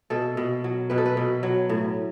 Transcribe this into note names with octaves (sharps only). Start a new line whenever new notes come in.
B2 A4
B2
F#3
B2 B4
A4
B4
B2
F#3
A2